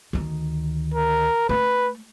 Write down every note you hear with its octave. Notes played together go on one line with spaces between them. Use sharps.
D2 D#3
A#4
A3 B4